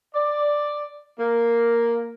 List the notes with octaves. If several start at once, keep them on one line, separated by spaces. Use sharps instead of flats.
D5
A#3